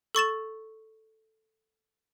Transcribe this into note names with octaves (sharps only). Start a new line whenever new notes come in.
A4 C#6 A6 E7